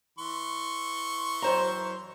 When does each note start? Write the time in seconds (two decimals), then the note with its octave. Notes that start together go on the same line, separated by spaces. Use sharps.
0.19 E3 C6 C#6
1.42 F#2 C5 A#5